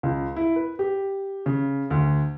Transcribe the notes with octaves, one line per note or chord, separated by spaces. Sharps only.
C#2
E4
B4
G4
C#3
D2